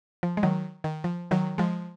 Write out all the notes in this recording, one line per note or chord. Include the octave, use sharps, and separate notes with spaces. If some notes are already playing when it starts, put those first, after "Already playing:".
F3
G#3
D#3 F#3
D#3
F3
D#3 F#3
F3 G#3